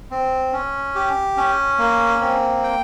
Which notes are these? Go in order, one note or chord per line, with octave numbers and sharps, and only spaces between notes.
C4
C#4
G4
C#4
A#3
C4
G5